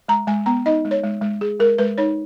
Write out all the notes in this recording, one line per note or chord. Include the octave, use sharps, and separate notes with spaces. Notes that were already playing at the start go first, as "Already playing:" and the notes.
G#3 A#5
G#3 G#5
B3 A#5
D#4 D#5
G#3
C#5
G#3
G#3
G#3 G#4
G#3 A#4
G#3 B4
D#4 C#5